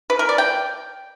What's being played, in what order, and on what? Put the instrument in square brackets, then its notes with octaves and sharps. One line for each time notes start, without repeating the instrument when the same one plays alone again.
[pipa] B4
A#4
D5
G5